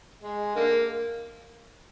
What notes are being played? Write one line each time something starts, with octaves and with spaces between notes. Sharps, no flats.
G#3
D3 A#3